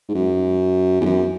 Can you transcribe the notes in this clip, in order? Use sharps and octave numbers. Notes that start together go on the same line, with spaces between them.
G#2
F#2
E2
F#2